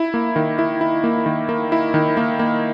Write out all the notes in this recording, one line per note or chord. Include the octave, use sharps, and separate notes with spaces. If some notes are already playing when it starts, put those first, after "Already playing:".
Already playing: E4
A#3
D#3
E4
E4
A#3
D#3
A#3
E4
D#3
A#3
A#3